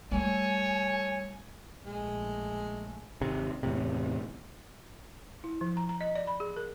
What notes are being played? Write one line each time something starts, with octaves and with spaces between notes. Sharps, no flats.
G3 A3 A4 C#5 G#5
A#1 G#3 A3
G#1 C3
E2 A2 C3
E4
F3
A#5
A#5
D#5
D5
B5
G#4
A#4